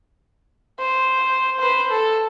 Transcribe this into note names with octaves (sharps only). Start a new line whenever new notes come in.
C5
B4 C5
A4